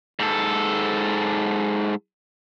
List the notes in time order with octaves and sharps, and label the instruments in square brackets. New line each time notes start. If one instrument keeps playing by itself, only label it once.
[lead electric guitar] G#2 A4